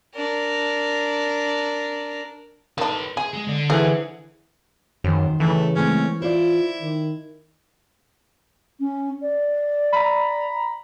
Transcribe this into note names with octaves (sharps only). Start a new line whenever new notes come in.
D4 A#4
D#3 D4 A4 B4
G#4 G#5
G#3
D3 D4
E3 G#4 A4 C5 F#5
F#2 D#3 C5
C#3 E3 A3
G#3 A3 C4 C#4
E4 F4 C5 D5
D#3
C#4
D5
A#5 B5